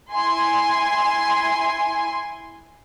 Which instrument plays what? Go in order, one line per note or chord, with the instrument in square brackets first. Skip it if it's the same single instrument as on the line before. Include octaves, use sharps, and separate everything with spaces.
[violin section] E4 G#5 C6